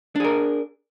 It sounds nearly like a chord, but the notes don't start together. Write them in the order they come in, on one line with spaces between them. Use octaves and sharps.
D4 G#4 A#4